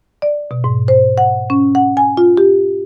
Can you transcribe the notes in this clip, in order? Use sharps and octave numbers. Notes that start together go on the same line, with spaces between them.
D5
B2
G#2
C5
F#5
C#4
F#5
G#5
F4
G4